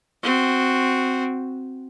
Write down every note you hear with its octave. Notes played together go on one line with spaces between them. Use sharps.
C4 F#4